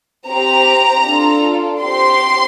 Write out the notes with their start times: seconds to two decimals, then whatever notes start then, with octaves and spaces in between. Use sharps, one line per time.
0.28 C4 G4 A#5
1.05 D4 F4 A4
1.82 C4 G4 C6